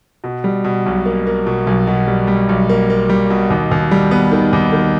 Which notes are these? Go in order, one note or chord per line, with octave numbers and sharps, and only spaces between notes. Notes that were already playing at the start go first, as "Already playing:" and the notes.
B2
G3
B2
B1
A#3
A#3
B2
B1
B2
G3
G3
B1
A#3
A#3
G3
B2
D#2
D#2
G3
B3
D#3
D#2
D#3